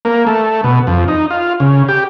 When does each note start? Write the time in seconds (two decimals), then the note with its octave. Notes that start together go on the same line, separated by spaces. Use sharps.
0.05 A#3
0.27 A3
0.64 B2
0.87 F2
1.08 D#4
1.30 F4
1.60 C#3
1.88 G4